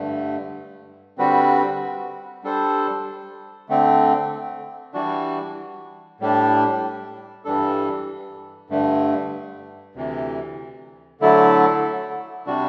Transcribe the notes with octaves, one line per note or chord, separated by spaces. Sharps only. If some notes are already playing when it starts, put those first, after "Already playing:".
Already playing: G2 D3 A3
D3 G3 C4 F#4 B4
G3 D4 A4 C5
D3 A3 C4
E3 G3 D4 F#4
A2 G3 D4
G2 E3 G3 D4 A4
G2 D3 A3
D2 C3 E3
D3 F#3 A3 E4 A4
C3 G3 D4 F#4